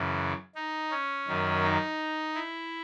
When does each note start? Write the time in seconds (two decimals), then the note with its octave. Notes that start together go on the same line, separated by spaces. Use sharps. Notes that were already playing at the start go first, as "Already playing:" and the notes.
Already playing: F#2 C#3 E3
0.55 D#4
0.91 C#4
1.27 F#2 D#3
1.64 D#4
2.35 E4